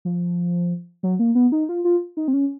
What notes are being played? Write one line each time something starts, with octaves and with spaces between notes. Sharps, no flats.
F3
F#3
A#3
B3
D#4
F4
F4
D#4
C4
C#4